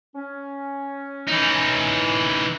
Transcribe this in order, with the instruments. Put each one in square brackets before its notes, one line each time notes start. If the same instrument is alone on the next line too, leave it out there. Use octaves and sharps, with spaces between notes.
[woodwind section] C#4
[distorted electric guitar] E3 D#4